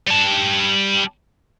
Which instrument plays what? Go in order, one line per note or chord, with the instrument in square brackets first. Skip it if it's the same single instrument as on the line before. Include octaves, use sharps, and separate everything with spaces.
[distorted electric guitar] G3 A5